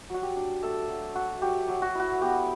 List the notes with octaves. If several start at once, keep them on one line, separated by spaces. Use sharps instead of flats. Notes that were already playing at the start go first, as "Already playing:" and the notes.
F#3 F#4
G4
D4
A3 A4
F#3
F#3 F#4
F#3 G4
F#3
F#4
E4 F#4
B3 G4